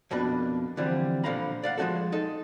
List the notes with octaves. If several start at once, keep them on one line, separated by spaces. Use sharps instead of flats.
F2 B2 A#3 D4 B4
D3 E3 F3 G3 C4
A#2 D3 F3 F5 A#5 B5
D5 F5 F#5
F3 G#3 C4 F#4 A4
D#4 A4